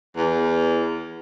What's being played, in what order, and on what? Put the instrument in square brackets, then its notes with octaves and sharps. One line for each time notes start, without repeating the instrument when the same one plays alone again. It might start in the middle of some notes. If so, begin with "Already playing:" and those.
[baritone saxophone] E2